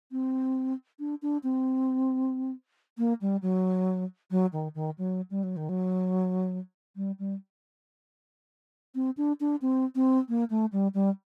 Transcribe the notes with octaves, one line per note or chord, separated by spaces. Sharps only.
C4
D4
D4
C4
A#3
G3
F#3
F#3
D#3
D#3
F#3
G3
F#3
D#3
F#3
G3
G3
C4
D4
D4
C4
C4
A#3
A3
G3
G3